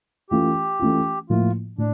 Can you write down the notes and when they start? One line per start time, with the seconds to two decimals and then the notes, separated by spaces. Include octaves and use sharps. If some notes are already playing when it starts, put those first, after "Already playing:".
0.30 E3 A3 C#4 F4 G4
0.80 E3 A3 C#4 F4
1.30 A2 F3 A#3 E4 F4
1.78 A2 D4